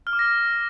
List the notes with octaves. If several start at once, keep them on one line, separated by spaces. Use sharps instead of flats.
F6
D6
A#6